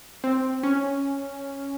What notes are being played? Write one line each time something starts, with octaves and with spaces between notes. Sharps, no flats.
C4
C#4